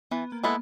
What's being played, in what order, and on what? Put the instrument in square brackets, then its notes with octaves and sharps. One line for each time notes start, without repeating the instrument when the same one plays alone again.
[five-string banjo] E3 [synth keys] B3
[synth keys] A#3
[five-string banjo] G#3 B3 E4 A4